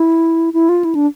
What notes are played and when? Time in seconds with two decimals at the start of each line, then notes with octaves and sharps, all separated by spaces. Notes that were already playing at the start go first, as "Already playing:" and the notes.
Already playing: E4
0.53 E4
0.69 F4
0.85 E4
0.95 D4